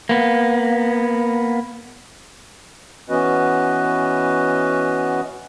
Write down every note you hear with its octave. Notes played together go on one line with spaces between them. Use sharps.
A#3 B3
E3 B3 C#4 F#4 B4 D#5